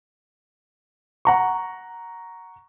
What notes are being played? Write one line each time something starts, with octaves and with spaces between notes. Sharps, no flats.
F#5 A#5 C#6